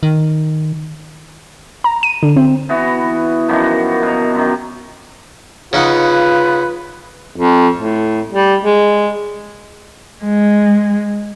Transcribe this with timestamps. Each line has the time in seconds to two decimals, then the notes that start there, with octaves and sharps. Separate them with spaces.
0.03 D#3
1.84 A#5
2.03 D#7
2.23 D3
2.37 C4
2.69 E3 B3 F#4
3.49 F#2 D#3 F3 F#4
4.02 B2 A#5
4.35 F#2 D#3
5.73 C#3 D#4 F4 B4 F#5
7.38 F2
7.78 A2
8.32 G3
8.65 G#3
10.24 G#3